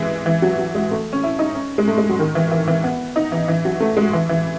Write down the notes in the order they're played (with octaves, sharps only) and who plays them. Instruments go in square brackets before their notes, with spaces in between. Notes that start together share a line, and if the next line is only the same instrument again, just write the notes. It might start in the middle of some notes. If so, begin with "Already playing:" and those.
Already playing: [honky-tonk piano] E3 G#3
E3
F#3
F#3
G#3
A3
C#4
E4
D#4
C#4
G#3
A3
G#3
F#3
D#3
E3
E3
E3
B3
D#4
E3
E3
F#3
A3
G#3
E3
E3